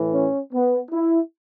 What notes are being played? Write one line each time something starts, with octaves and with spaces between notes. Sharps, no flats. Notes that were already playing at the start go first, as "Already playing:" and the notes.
Already playing: A2 E3
C#4
B3
E4